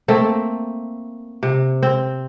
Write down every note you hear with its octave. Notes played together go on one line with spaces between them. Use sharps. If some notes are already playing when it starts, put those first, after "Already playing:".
A3 A#3 C4
C3
C4